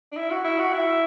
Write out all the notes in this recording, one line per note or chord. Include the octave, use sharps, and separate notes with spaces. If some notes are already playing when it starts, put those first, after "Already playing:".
D4
E4
F#4
E4
F#4
E4